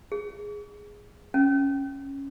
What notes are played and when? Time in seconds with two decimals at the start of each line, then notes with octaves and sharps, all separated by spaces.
0.12 G#4
1.34 C#4